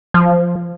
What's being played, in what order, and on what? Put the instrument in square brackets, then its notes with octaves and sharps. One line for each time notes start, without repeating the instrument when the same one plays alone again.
[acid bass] F3